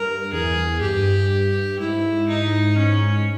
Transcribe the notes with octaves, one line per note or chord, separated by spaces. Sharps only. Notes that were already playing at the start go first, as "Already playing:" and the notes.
Already playing: G2 A#4
E2 G#4
G2 G4
G#2 E4
D#4
C#4